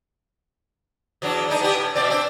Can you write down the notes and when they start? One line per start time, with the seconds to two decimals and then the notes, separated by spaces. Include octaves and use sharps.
1.22 E2 F#3 D4
1.49 G#3 D4 D#4
1.61 B3 G4
1.75 A2
1.95 B2 C4 D5
2.10 C4 D4